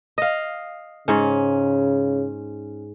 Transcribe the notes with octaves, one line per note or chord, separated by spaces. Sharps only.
D#5 F5
G#2 C#3 C#4